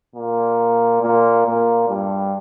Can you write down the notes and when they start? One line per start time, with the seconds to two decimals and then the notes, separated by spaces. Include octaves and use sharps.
0.15 A#2
1.02 A#2
1.46 A#2
1.89 G2